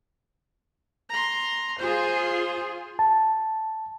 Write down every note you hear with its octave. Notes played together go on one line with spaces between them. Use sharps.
A#5 C6
F4 G#4 C5
A5